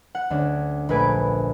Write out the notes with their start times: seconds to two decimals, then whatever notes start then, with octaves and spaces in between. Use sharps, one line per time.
0.15 F#5
0.30 D2 C#4 D4
0.89 A#1 A3 B4 G#5 D7